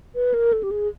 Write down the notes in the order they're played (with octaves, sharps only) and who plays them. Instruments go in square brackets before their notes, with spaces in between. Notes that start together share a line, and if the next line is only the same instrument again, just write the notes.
[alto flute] B4
A#4
A4
G4
G#4